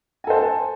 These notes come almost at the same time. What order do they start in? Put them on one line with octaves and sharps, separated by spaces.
G#5 A4 C5 A5